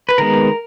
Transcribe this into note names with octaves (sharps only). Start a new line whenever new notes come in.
B4
D#3 G#3 B3 A#4